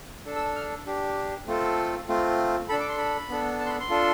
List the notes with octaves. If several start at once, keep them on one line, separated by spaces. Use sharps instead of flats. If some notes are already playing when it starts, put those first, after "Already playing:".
D4 A4
E6
F6
D4 G4
A3 C4 F4 A4
A3 C4 F4
D4 A4 B5
D6
C6
B5
B3 D4 A4
A5
C6
B5
C6
D4 F4 A4